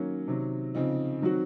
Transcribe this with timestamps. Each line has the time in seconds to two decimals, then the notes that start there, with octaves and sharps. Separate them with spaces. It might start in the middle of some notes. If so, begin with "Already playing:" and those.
Already playing: D#3 F#3 A#3 C#4
0.28 C3 D#3 F#3
0.75 C#3 F3 C4 D#4
1.22 D#3 F#3 C4 F#4